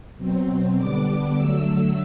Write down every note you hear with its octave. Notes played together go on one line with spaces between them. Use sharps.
B2 F#3 C4
D3 G3 B3 D4 D6
D3 F#3 A3 E6